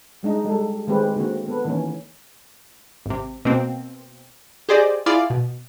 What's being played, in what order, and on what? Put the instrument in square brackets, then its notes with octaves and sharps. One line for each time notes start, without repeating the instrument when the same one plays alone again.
[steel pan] G3 G#3 D4 D#4
G3 G#3 A4
D#3 G#3 A3 C4 G4 B4
D3 A#3 C4 F#4
B3 A4 B4
D#3 E3 A3 A#3 C#4
[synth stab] G#1 C3
B2 A#3 C4
G4 G#4 C5 D5 D#5
E4 F4 G#4 D5 F5
B2